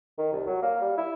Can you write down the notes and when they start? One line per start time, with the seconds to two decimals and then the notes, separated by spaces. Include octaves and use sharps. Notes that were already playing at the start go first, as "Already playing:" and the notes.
0.18 D#3
0.33 C2
0.47 F#3
0.62 A#3
0.81 G3
0.98 E4